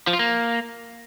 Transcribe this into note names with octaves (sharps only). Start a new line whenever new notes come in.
F3
F4
A#3